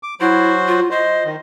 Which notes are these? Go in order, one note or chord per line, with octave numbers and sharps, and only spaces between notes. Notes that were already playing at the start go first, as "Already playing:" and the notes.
D6
F#3 E4 F#4 C5
F4
C5 D#5
D#3